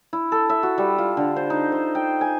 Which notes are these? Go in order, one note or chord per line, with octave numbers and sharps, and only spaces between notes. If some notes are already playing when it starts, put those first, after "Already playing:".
E4
A4
E5
F#4
G3
F4
D3
C5
D#4
C5
G5
G#5